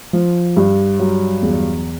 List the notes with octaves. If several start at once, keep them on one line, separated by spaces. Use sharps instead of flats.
F3
G2
F#3
E2